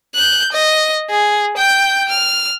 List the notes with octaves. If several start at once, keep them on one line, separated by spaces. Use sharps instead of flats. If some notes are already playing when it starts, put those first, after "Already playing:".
F#6 G6
D#5
G#4
G5 G6
F6